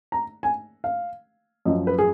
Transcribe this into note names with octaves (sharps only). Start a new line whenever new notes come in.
A#5
G#5
F5
F#2 F3 D#5
B4
G#4